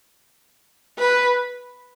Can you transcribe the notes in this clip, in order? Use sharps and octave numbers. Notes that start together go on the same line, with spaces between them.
B4